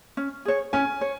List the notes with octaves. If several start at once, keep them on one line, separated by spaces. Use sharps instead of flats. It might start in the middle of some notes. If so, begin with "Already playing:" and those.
C#4
G#4 C#5
C#4 G#5
C#5